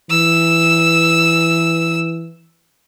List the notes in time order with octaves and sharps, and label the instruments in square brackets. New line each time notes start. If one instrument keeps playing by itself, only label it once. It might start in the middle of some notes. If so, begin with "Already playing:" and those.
[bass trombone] E3 [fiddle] E6